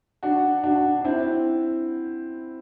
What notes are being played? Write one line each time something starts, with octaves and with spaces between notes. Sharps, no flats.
D4 F#4
D4 F#4
D4
C4 E4